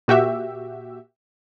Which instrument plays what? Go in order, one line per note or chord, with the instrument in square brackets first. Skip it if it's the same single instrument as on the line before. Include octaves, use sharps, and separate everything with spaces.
[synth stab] A#2 F#4 G4 E5